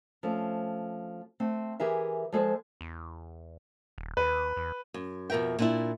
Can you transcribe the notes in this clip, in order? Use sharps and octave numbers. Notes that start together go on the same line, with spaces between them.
F3 A3 C4 C#4
A3 C4
E3 G4 G#4 A#4 E5
F3 G#3 A4 C5 D5
E2
D#1
D#2 B4
E2
F#2
F2 B2 A#4 E5 G5
A#2 D4 E4